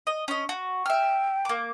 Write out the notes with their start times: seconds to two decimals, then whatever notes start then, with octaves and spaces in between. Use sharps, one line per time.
0.07 D#5
0.28 C#4 D#5
0.49 F#4
0.86 E5 G5 F6
1.45 A#3 D6